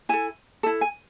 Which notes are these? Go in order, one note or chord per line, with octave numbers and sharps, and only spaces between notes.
E4 A4 G#5
E4 A4 A5
G#5